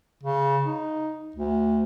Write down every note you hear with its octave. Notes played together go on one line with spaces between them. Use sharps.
C#3
D#4
D2